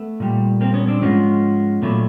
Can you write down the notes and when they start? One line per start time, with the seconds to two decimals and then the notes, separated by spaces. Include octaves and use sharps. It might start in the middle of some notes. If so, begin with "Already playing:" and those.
Already playing: A3 B3
0.20 A#2 G3
0.61 A#3 C4
0.74 B3 C#4
0.88 C4 D4
1.02 G#2 F3 G#3 B3 C#4
1.82 A#2 F#3 A3 B3